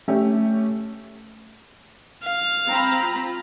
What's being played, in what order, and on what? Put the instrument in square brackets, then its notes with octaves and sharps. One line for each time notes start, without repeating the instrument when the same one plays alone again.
[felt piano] A3 C#4 G4 C#5
[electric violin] F5
[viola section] C4 A#5 B5
[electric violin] F4